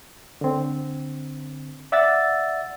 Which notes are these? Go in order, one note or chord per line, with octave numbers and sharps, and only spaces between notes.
D3 C4
D5 E5 F#5 E6 A6